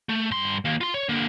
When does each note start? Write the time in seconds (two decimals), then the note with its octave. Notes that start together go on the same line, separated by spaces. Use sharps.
0.09 A3
0.31 G2 C6
0.65 D#2 A#3
0.81 F4 C6
0.94 C#5
1.09 D3 A#3